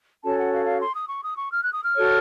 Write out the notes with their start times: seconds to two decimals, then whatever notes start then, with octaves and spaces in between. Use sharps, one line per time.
0.23 C#4 F#4 A4 C#5 A5
0.38 F#5
0.52 F5
0.66 F5
0.80 C6
0.94 D#6
1.08 C#6
1.23 D#6
1.36 C#6
1.51 F6
1.62 F#6
1.73 D#6
1.83 F6
1.94 F#4 A4 C#5